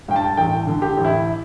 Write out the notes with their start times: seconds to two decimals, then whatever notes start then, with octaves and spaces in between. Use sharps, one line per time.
0.08 G2 G5
0.16 A5
0.37 A1 G5
0.67 D3
0.82 G4
0.97 A1
1.05 E4